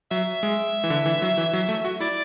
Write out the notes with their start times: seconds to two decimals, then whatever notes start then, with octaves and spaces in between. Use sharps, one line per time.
0.11 F#3 E5
0.43 G#3
0.84 E3
0.90 D3
1.06 E3
1.22 F#3
1.38 E3
1.53 F#3
1.69 A3
1.85 F#4
2.00 E4 D5